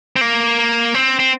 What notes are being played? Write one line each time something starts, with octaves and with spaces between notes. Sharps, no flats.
C4
A#3
C4
C4